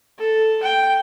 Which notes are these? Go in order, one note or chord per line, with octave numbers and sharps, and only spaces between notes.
A4
G5